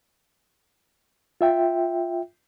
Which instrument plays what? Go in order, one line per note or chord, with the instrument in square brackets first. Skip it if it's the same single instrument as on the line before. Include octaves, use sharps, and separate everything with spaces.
[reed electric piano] F4 E5 G5